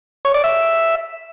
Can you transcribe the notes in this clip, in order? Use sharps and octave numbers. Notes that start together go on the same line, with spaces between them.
C#5
D5
E5